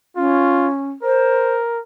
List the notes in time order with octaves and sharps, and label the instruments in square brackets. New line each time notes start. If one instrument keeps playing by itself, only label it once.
[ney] C#4 [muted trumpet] F4
[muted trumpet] A#4 [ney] C5